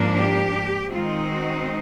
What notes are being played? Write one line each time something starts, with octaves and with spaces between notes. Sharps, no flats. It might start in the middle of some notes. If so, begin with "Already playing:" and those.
Already playing: G#2 F3 A#3 D4
G4
D#3 G#3 C4 D#4 F4
F#4